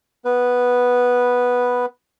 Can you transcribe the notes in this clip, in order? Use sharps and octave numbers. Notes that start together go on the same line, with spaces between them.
B3 B4